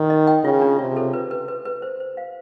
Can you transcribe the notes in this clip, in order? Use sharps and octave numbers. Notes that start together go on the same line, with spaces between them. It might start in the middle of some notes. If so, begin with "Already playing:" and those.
Already playing: D#3
D#5
G5
C#3 F4
D4
C3 F4
A4
B4
B4
B4
B4
C5
C5
F5